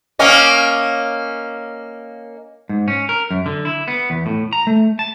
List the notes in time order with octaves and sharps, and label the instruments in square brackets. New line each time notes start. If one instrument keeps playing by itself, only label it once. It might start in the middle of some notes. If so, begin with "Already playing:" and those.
[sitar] A#3 C#4 D#5
[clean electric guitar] G#2
C#4
A#4
F#2
D3
E4
B3
E2
A2
A#5
A3
A5